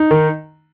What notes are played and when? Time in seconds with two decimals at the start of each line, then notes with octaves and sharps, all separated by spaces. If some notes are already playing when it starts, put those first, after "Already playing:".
Already playing: D#4
0.11 D#3